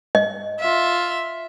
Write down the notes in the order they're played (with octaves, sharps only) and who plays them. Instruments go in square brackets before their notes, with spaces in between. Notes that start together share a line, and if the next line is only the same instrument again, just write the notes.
[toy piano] D#5
[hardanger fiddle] F4 E5